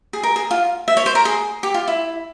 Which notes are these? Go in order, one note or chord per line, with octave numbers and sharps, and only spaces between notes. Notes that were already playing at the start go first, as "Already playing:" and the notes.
G#4
A#4
G#4
F4
E5
C#5
C5
A#4
G#4
G4
F4
E4